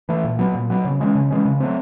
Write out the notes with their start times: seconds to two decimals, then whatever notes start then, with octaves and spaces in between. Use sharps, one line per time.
0.09 E3 A3
0.24 A#2
0.39 F#3 B3
0.55 A#2
0.70 F#3 B3
0.85 C#3
1.00 E3 G#3 C#4
1.15 C#3
1.31 E3 G#3 C#4
1.45 C#3
1.60 F#3 A3 C4